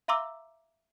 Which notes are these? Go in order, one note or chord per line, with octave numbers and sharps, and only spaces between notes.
E5 F5 A#5 C6 D6 E6